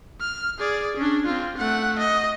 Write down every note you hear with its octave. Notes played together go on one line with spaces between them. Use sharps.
F6
G#4 D5
C#4 D4
C4 F4
A3 F#5
D#5